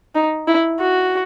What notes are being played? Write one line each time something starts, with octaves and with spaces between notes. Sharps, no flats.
D#4
E4
F#4